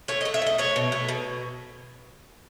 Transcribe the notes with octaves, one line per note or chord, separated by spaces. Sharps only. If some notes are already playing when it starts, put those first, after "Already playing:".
A3 C#5
D#5
A3
E5
A3 D#5
A3 C#5
B2
A3
B2